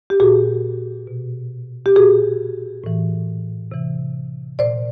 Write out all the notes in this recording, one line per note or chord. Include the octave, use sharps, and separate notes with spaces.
G4
A#2 F#4 G#4
B2
G4
A#2 F#4 G#4
A2 E3
C3 E3
A#2 C5 D5